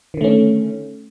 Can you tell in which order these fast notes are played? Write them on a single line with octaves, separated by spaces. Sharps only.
D#3 D3 A3 C#4